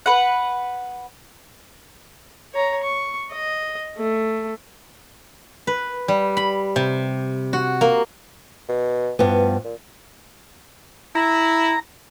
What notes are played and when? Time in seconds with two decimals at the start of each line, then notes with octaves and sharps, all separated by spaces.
0.06 B4 F#5
2.54 C#5 A#5
2.83 C#6
3.33 D#5
3.97 A3
5.67 B4
6.08 G3
6.37 B5
6.76 C3
7.53 F#4
7.81 A#3
8.69 B2
9.19 G2 F3 B3
9.64 A#2
11.15 E4 A#5